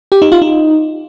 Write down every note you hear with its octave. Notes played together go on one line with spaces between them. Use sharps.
G4
D#4
F4
D#4